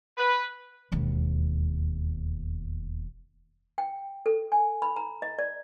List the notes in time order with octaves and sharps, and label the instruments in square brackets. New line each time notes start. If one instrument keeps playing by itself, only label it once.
[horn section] B4
[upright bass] E1 D#2
[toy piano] G5
A4
G#5
B5
A#5
D#5
D5